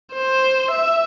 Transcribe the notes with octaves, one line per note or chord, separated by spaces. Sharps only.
C5
E5